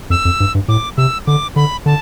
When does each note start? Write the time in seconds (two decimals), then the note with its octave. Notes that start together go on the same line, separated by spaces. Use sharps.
0.10 F2 E6
0.25 F2
0.40 G2
0.55 G2
0.68 A2 D6
0.97 C3 E6
1.27 D3 D6
1.56 D3 B5
1.86 D3 A5